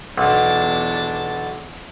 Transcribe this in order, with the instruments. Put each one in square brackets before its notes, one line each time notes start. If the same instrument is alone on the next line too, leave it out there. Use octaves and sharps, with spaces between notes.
[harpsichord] B1 [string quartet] E2 D4 A6